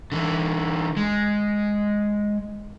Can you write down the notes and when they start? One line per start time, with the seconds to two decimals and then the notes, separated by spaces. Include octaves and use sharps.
0.12 D3 E3
0.97 G#3